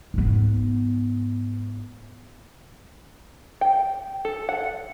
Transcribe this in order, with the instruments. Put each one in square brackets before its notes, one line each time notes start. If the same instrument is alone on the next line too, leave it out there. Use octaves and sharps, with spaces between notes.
[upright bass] G#2 B3
[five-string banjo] G5
A4
F#5